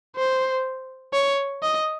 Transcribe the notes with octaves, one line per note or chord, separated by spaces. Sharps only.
C5
C#5
D#5